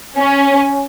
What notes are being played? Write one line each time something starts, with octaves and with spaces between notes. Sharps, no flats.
C#4